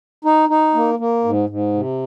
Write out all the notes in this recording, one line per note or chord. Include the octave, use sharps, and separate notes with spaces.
D#4
D#4
A#3
A#3
G#2
G#2
C3